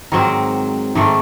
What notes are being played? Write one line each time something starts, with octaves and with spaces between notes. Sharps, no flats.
G#2 D#3 F#3 C4
G#2 D#3 A3